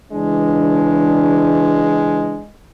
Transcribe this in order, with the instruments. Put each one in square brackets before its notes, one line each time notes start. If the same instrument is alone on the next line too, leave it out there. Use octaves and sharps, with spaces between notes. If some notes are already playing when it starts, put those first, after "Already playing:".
[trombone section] C#2 E3 D4 [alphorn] G#3